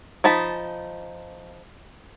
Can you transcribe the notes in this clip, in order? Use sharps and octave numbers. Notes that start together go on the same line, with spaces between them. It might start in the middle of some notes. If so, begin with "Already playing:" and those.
F3 D#4 A5 B5